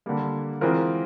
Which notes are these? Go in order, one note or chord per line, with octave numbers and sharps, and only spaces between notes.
D3 G3 A#3
E3 G#3 C4 F4 A#4